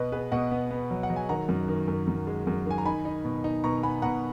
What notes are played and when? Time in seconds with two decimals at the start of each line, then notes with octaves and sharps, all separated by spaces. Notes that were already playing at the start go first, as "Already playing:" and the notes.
Already playing: B2 B3 B4 D#5
0.12 B3 G#4 B4
0.32 B2 D#5 F#5
0.51 B3
0.71 B3
0.91 F#3
1.03 F#5
1.10 F#3
1.16 G#5
1.29 D#3 F#5 A#5
1.49 F#2
1.68 D#3
1.88 F#2
2.07 F#2
2.27 G#3
2.47 F#2
2.66 D#3 G#5
2.78 A#5
2.86 D#4 G#5 B5
3.05 D#4
3.25 B2
3.44 D#4
3.64 B2 A#5 C#6
3.83 B3 G#5 B5
4.02 B2 F#5 A#5